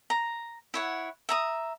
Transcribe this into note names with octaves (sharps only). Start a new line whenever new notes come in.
A#5
E4 C#5 F#5
E5 A#5 D#6